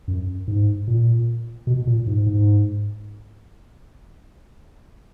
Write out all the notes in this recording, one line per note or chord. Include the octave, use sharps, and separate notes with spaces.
F#2
G#2
A#2
B2
A#2
G#2
G#2